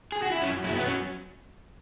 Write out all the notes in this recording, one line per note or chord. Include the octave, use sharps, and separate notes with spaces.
G#4
F#4
E4
F#2 C#4
F#3 E4
B3
C#4